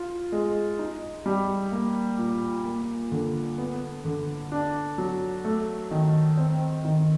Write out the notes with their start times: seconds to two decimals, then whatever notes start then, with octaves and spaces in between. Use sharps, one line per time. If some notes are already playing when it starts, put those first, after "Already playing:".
Already playing: F4
0.32 G#3
0.79 D#4
1.26 G3
1.72 A#3
2.19 A#2
2.65 A#3
3.12 D3
3.58 B3
4.05 D3
4.52 D4
4.98 F#3
5.44 A3
5.91 D#3
6.37 C4
6.85 D#3